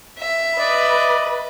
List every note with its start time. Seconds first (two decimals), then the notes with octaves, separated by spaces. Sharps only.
0.20 E5
0.59 B4 D5 D#5